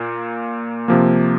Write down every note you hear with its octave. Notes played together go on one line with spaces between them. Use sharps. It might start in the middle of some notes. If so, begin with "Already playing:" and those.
Already playing: A#2 A#3
C3 F3 A#3